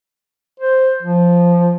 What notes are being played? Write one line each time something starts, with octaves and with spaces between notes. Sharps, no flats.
C5
F3